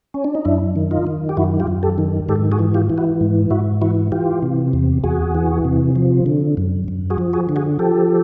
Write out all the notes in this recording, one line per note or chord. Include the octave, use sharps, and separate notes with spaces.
C#4
D4
D#4
F#2 D4 E4
D#3
D#4 F4
D#3
G4
F#2 E4 F#4
F4 G4
F#2
G4 A4
D#3
G#2 G4 A4
F#4 G#4
E3
F4 G4
E3
E4 F#4
G#2
G#2 E4 F#4
E3 E4 F#4
E3 F4 G4
C3
E2
E2 F#4 G#4
E3
C3
F3
D3
F#2
F#2
F#4 G#4
F3
F#4 G#4
D3
F#4 G#4
F3 G4 A4